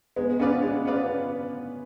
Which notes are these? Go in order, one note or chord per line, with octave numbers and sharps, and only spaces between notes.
G#3 B3
B3 C#4 F4 B4 D5
G#3 C#4
B3 F4 B4 D5